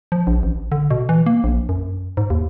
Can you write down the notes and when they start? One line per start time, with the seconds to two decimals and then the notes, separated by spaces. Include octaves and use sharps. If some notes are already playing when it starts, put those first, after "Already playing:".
0.12 F3
0.27 A#1
0.43 A1
0.72 D3
0.91 B2
1.09 E3
1.26 A#3
1.44 A#1
1.69 F#2
2.17 G#2
2.30 D#2